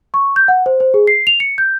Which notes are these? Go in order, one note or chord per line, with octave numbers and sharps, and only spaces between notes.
C#6
G6
F#5
C5
C5
G#4
C7
F7
C#7
G6